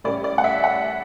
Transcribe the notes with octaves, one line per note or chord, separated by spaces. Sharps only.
A2 G3 C#4 D5
D5
F#5
E5
F#5